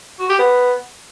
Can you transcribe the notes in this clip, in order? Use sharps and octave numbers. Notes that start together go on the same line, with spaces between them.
F#4
G4
B3